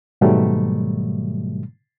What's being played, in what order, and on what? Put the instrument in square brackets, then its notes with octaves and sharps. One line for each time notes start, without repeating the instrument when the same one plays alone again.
[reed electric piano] G#2 B2 D#3 F#3 G3 A3